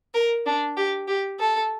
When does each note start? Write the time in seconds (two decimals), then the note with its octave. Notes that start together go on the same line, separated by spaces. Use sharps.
0.14 A#4
0.46 D4
0.77 G4
1.08 G4
1.40 A4